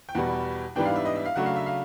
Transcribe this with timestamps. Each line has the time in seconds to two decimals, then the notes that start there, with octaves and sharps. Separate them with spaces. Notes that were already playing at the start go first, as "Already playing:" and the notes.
0.09 G5
0.15 E2 B2 G3 F#5
0.76 G#2 E3 G3 B3 D4 G5
0.86 F5
0.96 E5
1.05 D#5
1.15 E5
1.25 F5
1.36 C#3 F#3 A3 D4 F#5
1.46 F5
1.56 E5
1.66 F5